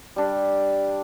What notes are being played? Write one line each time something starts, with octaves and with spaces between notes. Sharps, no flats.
G3 D4